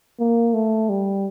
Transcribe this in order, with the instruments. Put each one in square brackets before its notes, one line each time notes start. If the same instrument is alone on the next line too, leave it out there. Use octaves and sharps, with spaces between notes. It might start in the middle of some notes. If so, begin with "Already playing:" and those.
[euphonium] A#3
A3
G3